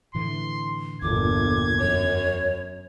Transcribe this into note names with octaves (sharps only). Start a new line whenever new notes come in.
A2 D3 E3 C6
G1 E2 A#2 D6 G#6
F#2 C#5